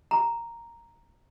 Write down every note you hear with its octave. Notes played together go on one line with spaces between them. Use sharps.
A#5